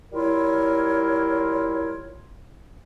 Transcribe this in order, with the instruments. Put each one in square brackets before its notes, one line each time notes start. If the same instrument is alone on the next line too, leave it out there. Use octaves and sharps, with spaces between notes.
[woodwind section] G3 E4 F4 A#4 C#5